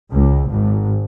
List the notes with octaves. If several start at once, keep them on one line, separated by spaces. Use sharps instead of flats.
C#2
G#1